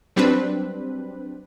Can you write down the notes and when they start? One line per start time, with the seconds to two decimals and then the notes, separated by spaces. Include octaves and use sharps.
0.16 F#3 G3 C4 D4 B4